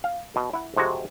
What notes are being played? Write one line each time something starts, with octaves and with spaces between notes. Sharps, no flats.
F5
B2
E4 F#5
F2 C3 G#3 F#4